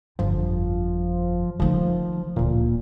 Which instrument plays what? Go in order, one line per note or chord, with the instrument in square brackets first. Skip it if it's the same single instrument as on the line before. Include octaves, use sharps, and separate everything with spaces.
[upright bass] G1 F2 [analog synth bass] F3
[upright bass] D#3 A3 [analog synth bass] F3
[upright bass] D1 D2 [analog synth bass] A#2